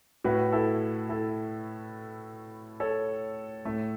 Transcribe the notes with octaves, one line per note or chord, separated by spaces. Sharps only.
A2 A3 F#4 B4
E4 A4
E4 A4
A4 C#5
A2 A3